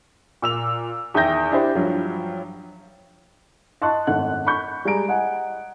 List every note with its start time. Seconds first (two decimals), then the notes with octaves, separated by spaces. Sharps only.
0.42 A#2 E6 F7
1.14 E2 D#3 E5 G5 G6 A#6
1.52 D4 E4 G4 C5
1.75 G2 F3 F#3
3.82 D#5 A5 C6 C#6 F#6
4.07 G#1 F#2 A3 F#5 F#6
4.46 B5 C#6 G6
4.85 G3 G#3 G#4 G#5 A#5 D7
5.08 D#5 F#5 G#5